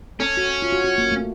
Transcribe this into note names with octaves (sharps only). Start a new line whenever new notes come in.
C#4 A4
F#4
F4
F#4
F#4
A#3
A3